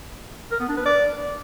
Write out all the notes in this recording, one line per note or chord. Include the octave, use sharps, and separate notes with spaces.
A#4
B3
D4
B4
D5